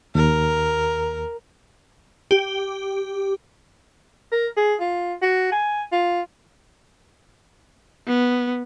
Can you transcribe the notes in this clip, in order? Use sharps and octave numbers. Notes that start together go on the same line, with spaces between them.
D#2 A#4
G4
A#4
G#4
F4
F#4
G#5
F4
B3